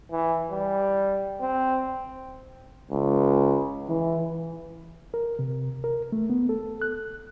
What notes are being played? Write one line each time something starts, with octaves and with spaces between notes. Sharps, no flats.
E3
G3
C4
C#2
E3
A#4
C3
A#4
A3
B3
A4
F#6